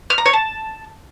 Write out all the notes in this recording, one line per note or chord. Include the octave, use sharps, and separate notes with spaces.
F6
A#5
C#5
A5